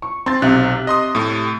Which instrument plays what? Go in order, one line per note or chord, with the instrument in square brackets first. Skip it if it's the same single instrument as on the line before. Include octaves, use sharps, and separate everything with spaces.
[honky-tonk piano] C#6
[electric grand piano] C4 [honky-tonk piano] C6 A6
[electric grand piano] B1 C4 F#6 [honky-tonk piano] C3 E5
[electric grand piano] D#5 C6 D#6
A2 A3